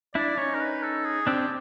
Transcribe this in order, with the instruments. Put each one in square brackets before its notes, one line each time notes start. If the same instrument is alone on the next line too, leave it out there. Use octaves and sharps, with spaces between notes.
[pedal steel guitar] D4 E4 [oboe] D5
[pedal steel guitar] C#4 D#4 [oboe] C#5
[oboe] A#4
B4
A4
G#4
[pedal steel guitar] C4 D4 [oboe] G4